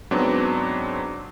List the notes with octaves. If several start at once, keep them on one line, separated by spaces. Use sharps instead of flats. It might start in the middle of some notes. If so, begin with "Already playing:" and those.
G#2 F#3 B3 C4 D4